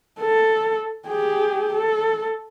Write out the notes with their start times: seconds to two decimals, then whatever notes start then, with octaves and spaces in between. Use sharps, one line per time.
0.20 A4
1.07 G4 G#4
1.74 A4